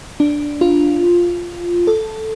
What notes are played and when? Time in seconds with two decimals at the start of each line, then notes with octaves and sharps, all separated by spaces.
0.20 D4
0.61 F4
1.87 A4